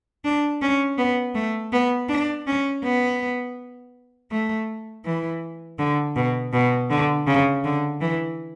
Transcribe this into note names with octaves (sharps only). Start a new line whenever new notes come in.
D4
C#4
B3
A3
B3
D4
C#4
B3
A3
E3
D3
B2
B2
D3
C#3
D3
E3